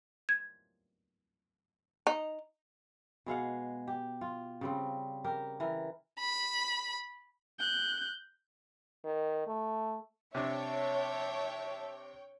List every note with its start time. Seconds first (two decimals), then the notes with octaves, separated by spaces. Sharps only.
0.29 G#6
2.07 D#4
3.26 B2 G#3 F5 F#5
3.87 G4
4.21 F4
4.61 C#3 G3 C4
5.24 G4 A#4
5.60 E3 A#4
6.19 B5
7.60 F#6 G6
9.04 D#3
9.47 A3
10.35 C3 D4 C#5 E5 G5 A5